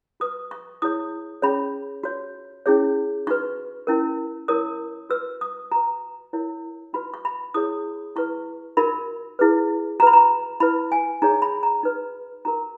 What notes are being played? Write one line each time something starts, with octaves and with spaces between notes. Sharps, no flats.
F#4 B4 D#6
C#6
E4 G#4 C#5 D#6
C#4 G#4 C#5 B5
F#4 C#5
C#4 E4 G#4 C#5
D#4 F#4 B4 C#6
C#4 E4 A#4
E4 A#4 C#5 D#6
F#4 B4 E6
D#6
F#4 B4 A#5
E4 A#4 C#5
D#4 F#4 B4 B5
C#6
B5
E4 G#4 C#5 D#6
E4 B4 C#6
D#4 F#4 A#4 B5
E4 G#4 B4
F#4 B4 A#5 B5
A#5
E4 B4 B5
G#5
D#4 G#4 C#5 A#5
B5
A#5
D#4 F#4 B4
D#4 F#4 A#4 A#5